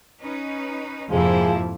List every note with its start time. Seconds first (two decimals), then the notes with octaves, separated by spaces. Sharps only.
0.21 C#4 D#4 B4
1.11 F2 G#2 C3 F3 G#3 A#3 E4